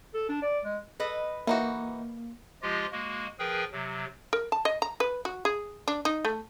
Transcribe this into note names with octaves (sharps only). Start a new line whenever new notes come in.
A4
D4
D5
G#3
A4 B4 D#5
E3 A#3 D#4 F#4
F3 G#3 F4 G4 D#5
G#3 A#3 F#4
F3 G#4 A#4 B4 G5
C3 F#3
A#4
A5
D#5
A#5
B4
F#4
G#4
D4
D#4
A3